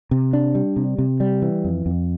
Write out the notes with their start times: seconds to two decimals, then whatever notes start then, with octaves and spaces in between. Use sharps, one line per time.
0.11 C3
0.33 D4
0.55 G3
0.76 C3
0.98 C3
1.20 G3
1.42 E3
1.64 F2
1.86 F2